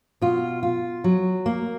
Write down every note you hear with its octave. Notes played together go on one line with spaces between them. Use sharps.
B2 F4
F4
F#3
A#3